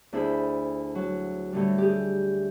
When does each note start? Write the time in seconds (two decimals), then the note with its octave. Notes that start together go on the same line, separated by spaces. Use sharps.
0.13 D2 D4 E4 G#4 C5 B5
0.95 F#3
1.52 A2 D3 G3
1.78 G4 G#4